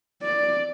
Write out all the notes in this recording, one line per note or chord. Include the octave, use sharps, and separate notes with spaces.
D5